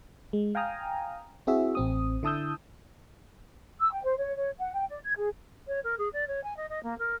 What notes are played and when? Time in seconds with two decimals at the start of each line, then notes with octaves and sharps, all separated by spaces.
0.33 G#3
0.55 F5 G5 G#5 A#5 D#6 F6
1.47 C4 E4 F#4 G#4 E5
1.75 A1 C4 D#6
2.23 D3 E4 A5 D#6 E6 G6
3.80 E6
3.92 G5
4.04 C5
4.17 C#5
4.36 C#5
4.59 F#5
4.74 G5
4.89 D5
5.05 G#6
5.17 G#4
5.67 C#5
5.84 A#4
5.98 G#4
6.13 D5
6.28 C#5
6.44 G#5
6.57 D#5
6.69 D#5
6.83 A#3
6.98 A#4